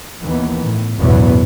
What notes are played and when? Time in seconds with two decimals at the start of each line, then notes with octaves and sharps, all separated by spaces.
0.23 D#2 D#3 E3 B3
0.62 A2
0.98 A1 E2 G2 B2 F#3 B3